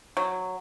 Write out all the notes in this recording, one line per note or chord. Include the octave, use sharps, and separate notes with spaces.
F#3